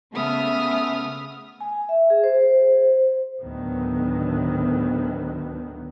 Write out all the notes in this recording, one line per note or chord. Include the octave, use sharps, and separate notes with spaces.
C#3 A3 B3 E5 D#6 F6
G#5
E5
G#4
C5
D2 A2 D#3 F#3 B3